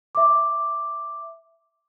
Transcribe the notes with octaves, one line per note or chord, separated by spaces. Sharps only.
E5 D6